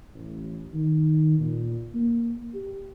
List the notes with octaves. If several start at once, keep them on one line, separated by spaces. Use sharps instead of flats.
A1
D#3
A#2
A#3
G4